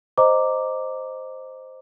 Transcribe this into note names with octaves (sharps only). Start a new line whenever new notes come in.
C5 D#5 A#5 D6